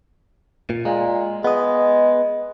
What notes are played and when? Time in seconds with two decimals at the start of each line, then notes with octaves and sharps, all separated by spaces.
0.70 A#2
0.85 A#2 G#3
1.44 G#3 B3 D#5